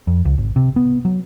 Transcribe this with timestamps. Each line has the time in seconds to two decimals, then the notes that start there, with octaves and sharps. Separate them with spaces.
0.07 F2
0.25 C#2
0.38 G#1
0.56 C3
0.76 B3
1.05 F#3